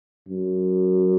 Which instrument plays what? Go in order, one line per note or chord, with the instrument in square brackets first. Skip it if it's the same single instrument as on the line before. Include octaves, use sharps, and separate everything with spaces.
[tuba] F#2